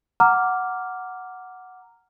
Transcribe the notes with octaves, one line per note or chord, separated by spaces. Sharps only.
F#5 A#5 D6 F6